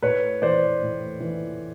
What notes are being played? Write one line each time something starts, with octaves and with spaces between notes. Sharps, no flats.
A2 B4 C#5
E3 C5 D5
A2
E3